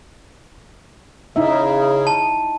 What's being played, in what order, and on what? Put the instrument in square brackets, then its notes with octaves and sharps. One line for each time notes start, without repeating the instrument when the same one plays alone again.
[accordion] C#3 [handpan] D#4 E4 E5
[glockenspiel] A5